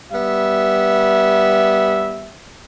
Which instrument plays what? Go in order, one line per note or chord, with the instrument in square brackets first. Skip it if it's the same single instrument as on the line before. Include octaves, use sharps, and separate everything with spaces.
[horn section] G3 B3 E5